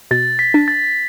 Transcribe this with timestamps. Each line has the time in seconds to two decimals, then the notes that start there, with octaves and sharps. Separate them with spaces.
0.11 B2 A6
0.39 B6
0.54 D4
0.68 A6